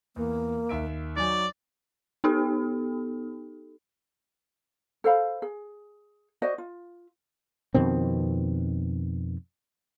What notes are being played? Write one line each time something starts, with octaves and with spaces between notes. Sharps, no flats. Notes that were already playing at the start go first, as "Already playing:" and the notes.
E2 A#3
D#2 E5 D7
F#3 D#4 D5 G#5
B3 D#4 G4 A4
A4 C5 F5 B5
G#4
F#4 C5 D5 D#5
F4
F2 B2 D#3 C4